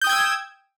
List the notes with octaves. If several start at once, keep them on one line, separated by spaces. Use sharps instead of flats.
G5 D#6 E6 G6 G#6